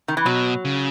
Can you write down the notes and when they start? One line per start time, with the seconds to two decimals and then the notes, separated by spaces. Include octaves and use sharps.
0.08 D#3
0.17 E3
0.26 B2 F#3
0.65 C#3